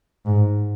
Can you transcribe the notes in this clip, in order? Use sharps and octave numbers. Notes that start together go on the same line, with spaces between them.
G#2